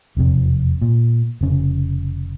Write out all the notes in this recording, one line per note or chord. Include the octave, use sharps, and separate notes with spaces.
E1 F2 C3
A#2
F1 C#3